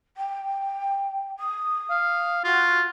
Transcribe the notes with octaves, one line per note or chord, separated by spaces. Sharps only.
G5
D#6
F5
F4 F#4